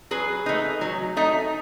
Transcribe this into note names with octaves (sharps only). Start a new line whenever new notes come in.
F#3 G#4 B4
A3 D#4
F#3
A3 D#4